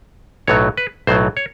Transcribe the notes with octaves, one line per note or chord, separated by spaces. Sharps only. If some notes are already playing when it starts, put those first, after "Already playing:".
B1 A2 F#3 C#5
B4
B1 A2 F#3 C5
C#5